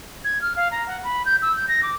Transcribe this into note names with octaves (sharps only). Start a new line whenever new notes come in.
G#6
F6
F5
A#5
F#5
B5
G6
E6
G6
A#6
D6